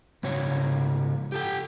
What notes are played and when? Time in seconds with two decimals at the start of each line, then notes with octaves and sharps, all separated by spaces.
0.23 G#2 C#3 F#4 C#5
1.32 G4 A4 G5